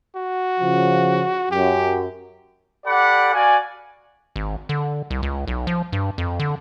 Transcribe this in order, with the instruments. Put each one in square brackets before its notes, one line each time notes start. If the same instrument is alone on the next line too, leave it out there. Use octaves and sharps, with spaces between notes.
[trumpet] F#4
[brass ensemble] C#3 F3
[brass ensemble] F#2 [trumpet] G4
[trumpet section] G4 A4 D5 F#5 B5 D6
F#4 D5 F5 G#5
[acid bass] G#1
D3
C2
C#2
B1
F3
G2
F2
D3